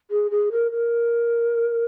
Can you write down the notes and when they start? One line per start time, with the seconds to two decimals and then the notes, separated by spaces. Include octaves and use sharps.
0.10 G#4
0.31 G#4
0.52 A#4
0.71 A#4